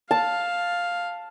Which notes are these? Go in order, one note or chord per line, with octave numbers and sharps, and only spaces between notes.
F5 A5